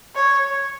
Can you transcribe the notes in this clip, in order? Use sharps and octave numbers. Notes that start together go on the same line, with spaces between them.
C#5